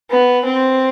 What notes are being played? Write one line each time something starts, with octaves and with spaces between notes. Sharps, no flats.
B3
C4